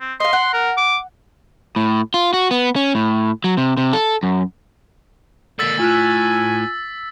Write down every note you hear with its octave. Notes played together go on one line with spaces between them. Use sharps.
C4
D#5 F5 C6
F#5
A#4
D6
A2
F4
F#4
B3
C#4
A2
F#3
C3
C3
A4
F#2
D3 A#3 E6 A6 B6
A2 F4 G#5 F6 F#6